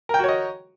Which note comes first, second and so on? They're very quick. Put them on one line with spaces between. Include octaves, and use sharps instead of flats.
A#4 G5 F#4 C#5 D#5